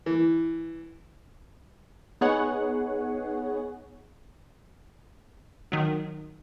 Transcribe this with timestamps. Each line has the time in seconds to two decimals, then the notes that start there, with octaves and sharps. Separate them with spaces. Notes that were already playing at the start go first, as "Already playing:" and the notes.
0.06 E3
2.21 B3 D#4 G#4 C#5 F#5
5.72 D#3 F#3